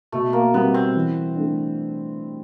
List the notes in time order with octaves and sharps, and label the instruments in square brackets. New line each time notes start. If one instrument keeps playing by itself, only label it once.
[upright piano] B2 [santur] A3
[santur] A#3
[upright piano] G3 C4 [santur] B3
[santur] C4
[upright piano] E3
A3 D4